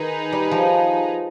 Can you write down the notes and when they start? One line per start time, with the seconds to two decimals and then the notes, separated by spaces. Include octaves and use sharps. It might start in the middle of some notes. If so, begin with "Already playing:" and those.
Already playing: D#3 D#4 G#4 B4
0.32 G3
0.51 F3